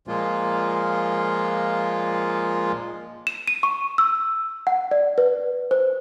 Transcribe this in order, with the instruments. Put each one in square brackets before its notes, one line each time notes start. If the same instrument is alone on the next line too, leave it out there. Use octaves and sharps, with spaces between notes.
[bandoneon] A#2 F3 G#3 A#3 F4
[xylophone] E7
D#7
C#6
E6
F#5
D5
B4
C5